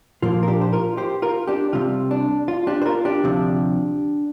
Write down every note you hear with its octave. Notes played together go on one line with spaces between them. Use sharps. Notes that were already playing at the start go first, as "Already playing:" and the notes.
A#2 F3 A#3 F4
A#4
D4 G4
C5
F4 A#4
G4 C5
F4 A#4
D4 G4
C2 C3 G3 F4
D4
F4
D4 G4
C5
F4 A#4
D4 G4
D2 C3 F3